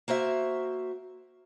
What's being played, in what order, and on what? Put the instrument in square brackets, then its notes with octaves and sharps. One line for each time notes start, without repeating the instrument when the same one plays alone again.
[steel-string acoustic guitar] A#3 F#4 C5 E5